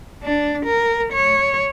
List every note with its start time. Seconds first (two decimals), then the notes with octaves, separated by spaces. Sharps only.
0.23 D4
0.65 A#4
1.13 C#5